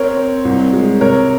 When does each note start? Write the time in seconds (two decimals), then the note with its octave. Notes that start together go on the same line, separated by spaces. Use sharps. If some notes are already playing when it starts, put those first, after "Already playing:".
Already playing: C4 A#4 C#5
0.16 C4
0.45 C2
0.73 G#3
1.01 C3 A#4 C#5